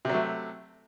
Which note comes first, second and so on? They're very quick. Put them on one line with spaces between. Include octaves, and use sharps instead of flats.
C3 F#3 A3